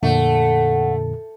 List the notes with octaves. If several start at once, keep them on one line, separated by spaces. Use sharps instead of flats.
F2 A#2 D3 A3 F#5